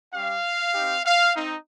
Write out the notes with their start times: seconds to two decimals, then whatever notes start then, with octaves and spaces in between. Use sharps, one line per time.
0.14 G3 C#4 G4 F5
0.75 C4 D#4 G4
1.06 F5
1.36 C4 D#4